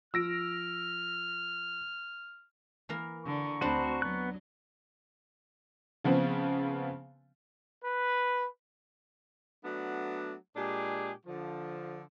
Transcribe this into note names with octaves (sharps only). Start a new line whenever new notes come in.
F3 E6 F6 A#6 D7
E3 A#3 A#4
D3 A#5 C#6
D2 C4 D4 F#4 B4 C5 C6
F#3 B3 F#6
C#3 F3 B3 C4
B4
F#3 A3 B3 D4
A#2 G#3 D4 G4 G#4
D3 F3